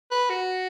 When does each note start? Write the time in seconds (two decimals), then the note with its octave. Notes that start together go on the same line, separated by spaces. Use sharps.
0.11 B4
0.30 F#4